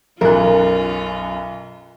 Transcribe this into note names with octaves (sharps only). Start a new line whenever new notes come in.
B1 F#2 C#4 F4 A#4 F#6